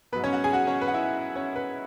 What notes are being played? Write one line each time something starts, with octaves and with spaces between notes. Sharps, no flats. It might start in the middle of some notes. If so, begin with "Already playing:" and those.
G#2 F#3 B3 B4
C#4 C#5
F#4 F#5
G#4 G#5
F#4 F#5
C#4 C#5
B4
F#5
E4 E5
C#4 C#5
B4